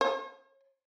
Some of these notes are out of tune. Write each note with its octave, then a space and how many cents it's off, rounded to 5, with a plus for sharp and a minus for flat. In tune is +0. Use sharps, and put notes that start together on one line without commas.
C#5 -35